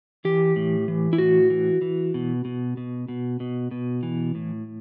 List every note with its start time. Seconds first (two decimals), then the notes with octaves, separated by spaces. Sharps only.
0.25 E3 G4
0.56 A2
0.88 E3
1.13 E4
1.18 A2 F#4
1.50 E3
1.82 E3
2.14 B2
2.45 B2
2.77 B2
3.08 B2
3.40 B2
3.71 B2
4.03 E3
4.35 A2